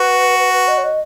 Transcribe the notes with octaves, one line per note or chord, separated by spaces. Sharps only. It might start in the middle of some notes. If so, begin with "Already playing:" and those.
Already playing: F#4 B4
B4
B4
D#5
C#5
D#5